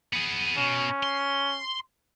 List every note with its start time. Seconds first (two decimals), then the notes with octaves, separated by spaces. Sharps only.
0.13 B3 G#4
0.57 B2 C#4
1.03 C6